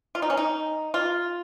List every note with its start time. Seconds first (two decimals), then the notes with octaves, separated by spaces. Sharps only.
0.15 F4
0.22 D#4
0.30 C#4
0.37 D#4
0.94 F4